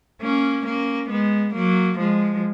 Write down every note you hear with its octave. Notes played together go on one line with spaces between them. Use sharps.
A#3 C#4
A#3 C#4
G#3 B3
F#3 A#3
F3 G#3